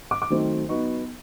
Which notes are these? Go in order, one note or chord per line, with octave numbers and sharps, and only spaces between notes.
D6
D6
D#3 F#3 A3 C4 D#4
F#3 B3 D#4 C#6